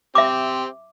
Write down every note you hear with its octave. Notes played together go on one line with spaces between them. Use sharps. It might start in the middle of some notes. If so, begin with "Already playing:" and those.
C4 G4 E5 D6